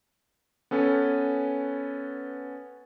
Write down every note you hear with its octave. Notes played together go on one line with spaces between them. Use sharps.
B3 C#4 A4 B4 G#5